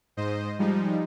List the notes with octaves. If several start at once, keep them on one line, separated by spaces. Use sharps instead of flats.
G#2 C5 D#5
F3 G3 G#3 D#4